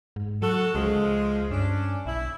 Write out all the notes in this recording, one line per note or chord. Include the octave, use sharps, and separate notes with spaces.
G#2
F#3 F#4 A4
C#2 F3 G#3
G2 C#4 D4
B1 E4